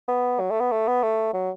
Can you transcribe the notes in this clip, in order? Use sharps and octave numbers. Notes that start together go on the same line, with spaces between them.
B3
F#3
A3
B3
A3
B3
A3
F#3